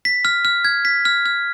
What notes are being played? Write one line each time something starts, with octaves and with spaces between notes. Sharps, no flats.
B6
F6
F6
G#6
B6
F6
F6